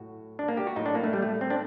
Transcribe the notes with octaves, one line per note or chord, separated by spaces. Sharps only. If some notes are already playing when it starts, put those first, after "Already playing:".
Already playing: A2 F#3 F#4
D4
A#3
G4
F#4
A2 F#3 D#4
D4
A#3
A3
G3
A3
C4
D4